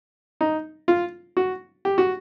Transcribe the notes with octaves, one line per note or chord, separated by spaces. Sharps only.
D#4
F4
F#4
G4
F#4